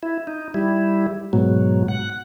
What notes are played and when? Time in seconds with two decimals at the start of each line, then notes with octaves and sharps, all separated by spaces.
0.03 E4
0.27 D#4
0.54 G3 E4
1.33 G#2 B2 F#3
1.88 F#5